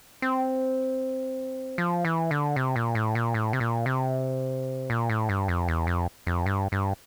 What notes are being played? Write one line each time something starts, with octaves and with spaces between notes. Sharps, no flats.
C4
F3
E3
D3
C3
A#2
A2
A#2
A2
C3
A#2
C3
A#2
A2
G2
F2
E2
F2
F2
G2
G2